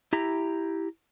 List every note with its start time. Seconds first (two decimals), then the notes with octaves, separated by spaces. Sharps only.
0.13 E4 G4 A#5